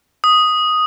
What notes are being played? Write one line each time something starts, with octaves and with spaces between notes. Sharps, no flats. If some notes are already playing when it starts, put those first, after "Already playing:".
D#6